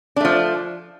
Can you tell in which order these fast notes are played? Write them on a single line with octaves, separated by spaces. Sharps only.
D4 A3 F3